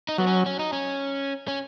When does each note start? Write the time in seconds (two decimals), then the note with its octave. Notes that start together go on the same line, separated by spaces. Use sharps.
0.09 D#4
0.18 F#3 B3
0.27 C#4
0.46 C#4
0.59 D#4
0.73 C#4
1.48 C#4